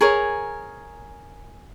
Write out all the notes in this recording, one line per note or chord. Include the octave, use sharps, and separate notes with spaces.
G#4 A#4 C#5